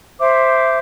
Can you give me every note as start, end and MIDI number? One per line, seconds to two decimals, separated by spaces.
0.20 0.78 72
0.20 0.78 76
0.20 0.78 86